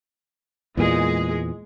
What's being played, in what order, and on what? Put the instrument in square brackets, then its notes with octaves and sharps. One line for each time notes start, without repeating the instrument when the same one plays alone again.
[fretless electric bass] E2 A#2 [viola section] G#3 G#4